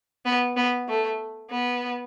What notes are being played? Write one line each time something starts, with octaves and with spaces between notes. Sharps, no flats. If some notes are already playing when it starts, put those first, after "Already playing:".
B3
B3
A3
B3